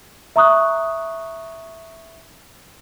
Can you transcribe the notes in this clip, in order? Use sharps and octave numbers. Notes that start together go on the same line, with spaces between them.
E5 A#5 C#6 D#6 F#6